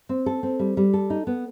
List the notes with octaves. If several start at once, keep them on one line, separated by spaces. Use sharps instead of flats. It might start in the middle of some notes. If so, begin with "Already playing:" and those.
C4
A4
C4
G3
G3
A4
D#4
B3